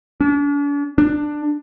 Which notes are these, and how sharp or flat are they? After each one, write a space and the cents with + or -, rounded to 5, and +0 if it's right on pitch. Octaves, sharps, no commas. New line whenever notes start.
D4 -45
D4 +15